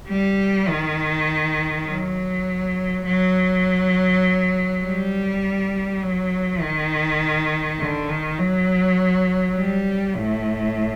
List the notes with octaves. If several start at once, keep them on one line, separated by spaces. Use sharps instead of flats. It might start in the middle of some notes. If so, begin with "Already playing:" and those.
G3
D#3
F#3
F#3
G3
F#3
D#3
D3
D#3
F#3
G3
A2